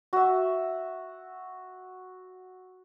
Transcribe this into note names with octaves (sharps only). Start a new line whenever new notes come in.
F#4 E5